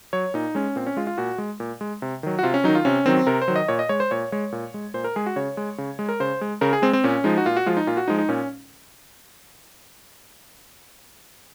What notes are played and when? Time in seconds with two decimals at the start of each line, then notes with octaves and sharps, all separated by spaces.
0.13 F#3 C#5
0.34 A#2 D#4
0.55 G#3 C#4
0.76 A#2 C4
0.87 C#4
0.97 G#3 F4
1.07 F4
1.18 A#2 F#4
1.38 G#3
1.60 A#2
1.81 G#3
2.02 C3
2.23 D#3 F#3
2.39 F#4
2.43 C3 F4
2.54 C#4
2.64 D#3 F#3 D#4
2.75 F4
2.85 C3 C#4
3.06 D#3 F#3 C4
3.27 C3 A#4
3.42 C5
3.48 D#3 F#3
3.56 D#5
3.68 A#2 C#5
3.79 D#5
3.89 G#3 C#5
4.00 C5
4.11 A#2 C#5
4.32 G#3 C#5
4.52 A#2
4.74 G#3
4.94 A#2 C5
5.04 A#4
5.16 G#3 G#4
5.26 F#4
5.36 C#3 C#5
5.57 G#3
5.78 C#3
5.99 G#3
6.09 A#4
6.20 C#3 C5
6.41 G#3
6.61 C#3 A#4
6.73 G#4
6.82 G#3 C4
6.93 C4
7.04 A#2 C#4
7.24 F3 G#3 D#4
7.38 F#4
7.46 A#2 F4
7.57 F#4
7.66 F3 G#3 F4
7.77 D#4
7.87 A#2 F4
7.97 F#4
8.08 F3 G#3 D#4
8.19 D#4
8.29 A#2 C#4